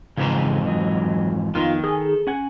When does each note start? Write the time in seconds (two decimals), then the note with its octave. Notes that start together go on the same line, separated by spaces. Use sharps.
0.17 F2 G#2 C#3 E3 G#4 A#5
0.67 F#3 D#5
1.55 F2 D#3 B3 D#4 F4
1.84 G#4 A4
2.27 C#4 F#5 G#5